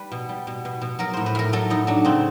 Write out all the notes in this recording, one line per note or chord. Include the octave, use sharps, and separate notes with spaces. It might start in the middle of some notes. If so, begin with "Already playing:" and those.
Already playing: G3 B4
B2
G3
B2
B2
B2
F#3 A#4
A2 C5
B4
A2 A#4
F#3 A4
A2 D#4
F#3 D4
C#3 C4